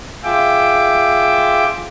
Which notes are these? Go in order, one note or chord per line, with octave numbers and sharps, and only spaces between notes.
F4 G#4 E5 G5 D6